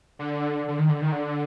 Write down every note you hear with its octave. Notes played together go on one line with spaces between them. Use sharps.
D3
D3
D#3
D3
D#3
D3